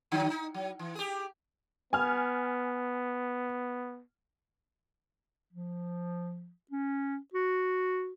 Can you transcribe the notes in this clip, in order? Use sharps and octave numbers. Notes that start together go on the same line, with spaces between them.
D3 F#3 D#4
D#4
F#3
E3
G4 G#4
B3 G#5 F6
F3
C#4
F#4